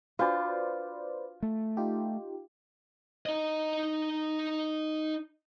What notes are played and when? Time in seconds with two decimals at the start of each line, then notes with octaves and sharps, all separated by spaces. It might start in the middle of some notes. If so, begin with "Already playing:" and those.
0.19 D4 F4 F#4 B4 C5 D5
1.43 A3
1.77 D#4 F4 G4
3.26 D#4 D#5